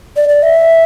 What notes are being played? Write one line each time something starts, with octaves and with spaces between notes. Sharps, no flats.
D5
D5
E5